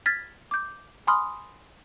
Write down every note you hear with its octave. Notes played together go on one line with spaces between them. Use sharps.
F6 G#6 A6 B6
D6 G6
G#5 B5 C6 D#6 F6